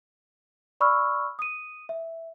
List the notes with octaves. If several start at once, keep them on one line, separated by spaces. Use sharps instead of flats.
D5 B5 C#6 E6 F6
D#6 D#7
E5